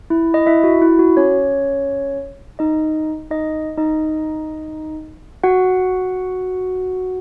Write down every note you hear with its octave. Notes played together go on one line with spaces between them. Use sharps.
E4
D#5
E4 E5
F#4
E4
F#4
C#4 C#5
D#4 D#5
D#4 D#5
D#4 D#5
F#4 F#5